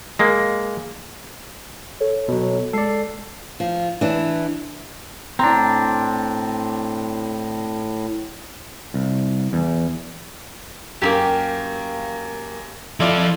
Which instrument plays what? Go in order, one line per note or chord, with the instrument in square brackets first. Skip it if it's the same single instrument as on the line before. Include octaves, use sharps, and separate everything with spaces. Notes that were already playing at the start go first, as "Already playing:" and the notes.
[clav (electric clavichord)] G#3 A#3
[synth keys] A4 C#5
[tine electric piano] B2 F#3
[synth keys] G#3 C7 [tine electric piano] A4 D5
[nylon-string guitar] F3
E3 D4
[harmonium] A2 [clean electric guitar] C4 D4 [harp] A#5
[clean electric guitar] C2
E2
[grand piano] F#2 [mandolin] A#3 E4 G4
[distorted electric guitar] F3 A4 [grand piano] E4 F4 D5